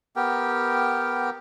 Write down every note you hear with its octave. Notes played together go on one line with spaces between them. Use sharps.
B3 G4 A#4 G5